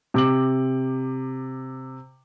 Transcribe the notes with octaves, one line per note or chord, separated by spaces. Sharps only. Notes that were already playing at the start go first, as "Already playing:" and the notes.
C3 D6 F#7